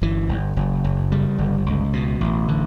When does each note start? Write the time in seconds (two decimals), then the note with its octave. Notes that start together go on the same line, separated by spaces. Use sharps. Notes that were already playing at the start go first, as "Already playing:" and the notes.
0.02 G1 E3
0.29 G1
0.57 F#1
0.84 F#1
1.11 C#3 G3
1.38 G1
1.66 C#2
1.93 B2
2.21 A1
2.48 D3